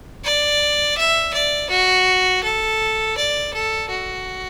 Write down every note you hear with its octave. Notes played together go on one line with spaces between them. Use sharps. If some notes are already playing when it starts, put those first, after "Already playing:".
D5
E5
D5
F#4
A4
D5
A4
F#4